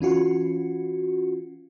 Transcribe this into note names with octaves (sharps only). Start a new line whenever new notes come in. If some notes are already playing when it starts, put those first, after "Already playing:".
E3 C#4 F4 F#4